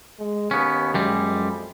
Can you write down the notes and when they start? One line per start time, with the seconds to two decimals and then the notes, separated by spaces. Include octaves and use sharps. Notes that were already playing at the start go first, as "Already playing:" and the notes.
0.19 G#3
0.51 D#2 B3 C#4
0.94 F#2 G3 G#3
1.31 F2